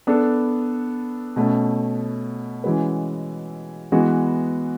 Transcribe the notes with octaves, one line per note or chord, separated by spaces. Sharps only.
B3 D4 A4
B2 A3 C#4
E3 G#3 C#4 F#4 B4
E3 G#3 B3 F#4